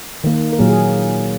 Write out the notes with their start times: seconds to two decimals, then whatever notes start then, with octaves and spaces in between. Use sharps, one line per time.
0.24 D#3 A#3
0.53 A#4
0.59 A#2 F#3 A#3 G#4
0.70 G#4